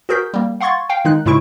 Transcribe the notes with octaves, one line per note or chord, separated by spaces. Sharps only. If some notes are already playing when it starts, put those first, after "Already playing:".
F#4 G#4 A#4 G6 B6
G3 A#3
F5 F#5 C6 C#6 G#6 A6
F5 G5
D#3 G#3 D#4 F#6
G#2 C#3 G#3 E4 C#6 D7